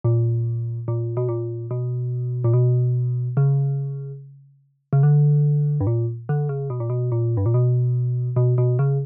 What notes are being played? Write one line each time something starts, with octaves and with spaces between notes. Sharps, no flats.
A#2
A#2
B2
A#2
B2
A#2
B2
C#3
C#3
D3
G2
A#2
D3
C#3
B2
A#2
B2
A#2
G2
A#2
B2
B2
B2
C#3